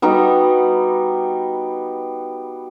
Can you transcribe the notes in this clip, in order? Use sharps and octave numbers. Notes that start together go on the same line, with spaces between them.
G3 B3 D#4 F#4